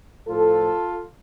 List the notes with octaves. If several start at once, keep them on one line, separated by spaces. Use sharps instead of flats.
A2 F3 F4 A4